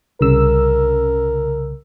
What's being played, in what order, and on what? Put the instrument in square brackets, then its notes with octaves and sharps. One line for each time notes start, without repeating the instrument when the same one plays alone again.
[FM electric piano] C2 C#3 E6 [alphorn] A#4